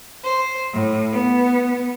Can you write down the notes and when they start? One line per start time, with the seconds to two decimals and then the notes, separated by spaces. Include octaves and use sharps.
0.23 C5
0.73 A2
1.13 B3